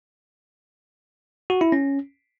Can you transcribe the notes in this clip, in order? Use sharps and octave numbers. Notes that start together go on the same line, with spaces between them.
F#4
E4
C#4